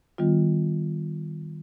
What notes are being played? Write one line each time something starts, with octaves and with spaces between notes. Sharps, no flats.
D#3 G3 B3 F4